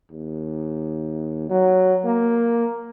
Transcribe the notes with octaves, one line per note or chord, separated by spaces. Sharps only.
D#2
F#3
A#3